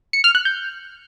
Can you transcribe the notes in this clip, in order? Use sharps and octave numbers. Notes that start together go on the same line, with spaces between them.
C#7
F6
F#6
G6